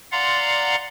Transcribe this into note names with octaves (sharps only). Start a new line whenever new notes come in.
D5 F5 F#5 A#5 C6